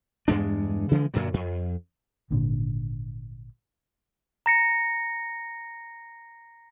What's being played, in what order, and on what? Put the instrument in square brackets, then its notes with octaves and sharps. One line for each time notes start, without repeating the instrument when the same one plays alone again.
[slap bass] E2 G2 G#3 D4
C#3 E3 F3 G#3
F#2 A#2 D3 F#3
F2
[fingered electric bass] G#1 A#2 D3
[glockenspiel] A#5 A#6 C#7